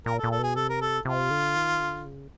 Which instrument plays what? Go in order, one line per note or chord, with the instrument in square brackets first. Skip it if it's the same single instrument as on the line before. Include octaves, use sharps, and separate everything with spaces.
[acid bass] A#2 [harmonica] A#4
[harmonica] A4
[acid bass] A#2
[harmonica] A4
[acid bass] B2 [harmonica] G#4
[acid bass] C3 [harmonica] A4
[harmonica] A#4
A4
[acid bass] C3 [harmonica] F4
[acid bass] D3
D#3
D3
C#3